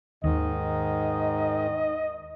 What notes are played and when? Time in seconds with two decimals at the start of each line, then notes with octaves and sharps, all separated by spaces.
0.24 D#2 G#2 D#3 D#5